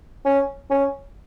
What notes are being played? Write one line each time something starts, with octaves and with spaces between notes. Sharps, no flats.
C#4
C#4